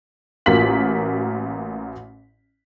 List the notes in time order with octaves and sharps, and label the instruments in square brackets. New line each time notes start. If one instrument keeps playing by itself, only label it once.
[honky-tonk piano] A1 A#3 F4 F#4 B6 F#7